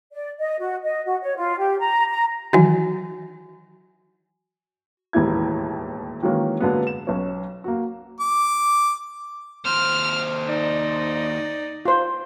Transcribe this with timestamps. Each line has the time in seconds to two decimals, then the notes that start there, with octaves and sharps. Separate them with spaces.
0.13 D5
0.40 D#5
0.60 F#4
0.84 D#5
1.06 F#4
1.22 C#5
1.37 F4
1.58 G4
1.79 A#5
2.09 A#5
2.53 D#3 E3 F#3 F#4 G#5
5.13 E1 D#2 A2 E3 E4 G#6
6.23 D#3 E3 F#3 G#3 A#3 C#4
6.60 D3 F#3 G#3 A#3 B3
6.87 E7
7.07 B1 C#4
7.64 A#3 F#4
8.20 D6
9.65 D#2 C5 F6
10.49 D#4 D5
11.85 F4 C5